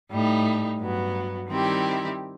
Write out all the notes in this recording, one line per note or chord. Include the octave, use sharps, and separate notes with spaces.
A2 G3 D#4
G2 F#3 B3
D#3 G3 C4 E4 G4